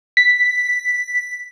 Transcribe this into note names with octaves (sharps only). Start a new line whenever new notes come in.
B6